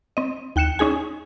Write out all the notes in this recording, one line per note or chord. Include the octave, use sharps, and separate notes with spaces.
C4 D#5
D#2 G5 F#6 C#7 E7
C#4 D#4 G#4 G#5